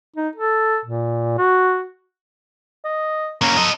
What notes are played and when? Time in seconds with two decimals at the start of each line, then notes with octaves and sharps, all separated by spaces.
0.16 D#4
0.36 A4
0.85 A#2
1.38 F#4
2.85 D#5
3.42 A#3 C#4 A#5
3.57 A4 D#5